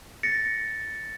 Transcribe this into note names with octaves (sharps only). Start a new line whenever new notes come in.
A6 A#6 C#7